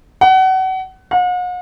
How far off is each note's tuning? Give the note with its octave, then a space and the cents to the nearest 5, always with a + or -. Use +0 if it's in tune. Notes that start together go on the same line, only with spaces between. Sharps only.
F#5 +30
F#5 -45